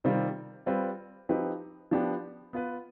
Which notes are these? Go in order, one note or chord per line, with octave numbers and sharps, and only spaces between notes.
C3 D#3 G3 C4 F4
G3 C4 F4 B4
F3 C4 D#4 G4 B4
F3 B3 D4 G4
B3 F4 B4